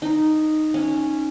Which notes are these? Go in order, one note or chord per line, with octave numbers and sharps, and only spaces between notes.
D#4
C#4